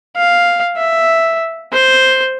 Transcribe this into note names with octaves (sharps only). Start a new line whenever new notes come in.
F5
E5
C5